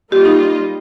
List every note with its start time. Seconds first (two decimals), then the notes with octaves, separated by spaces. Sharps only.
0.12 G3 A#3 F4 G4 D#5
0.25 D#4